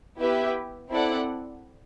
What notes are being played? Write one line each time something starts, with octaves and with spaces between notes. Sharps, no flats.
B3 E4 G4 B4 E5
C4 E4 A4 D5 F#5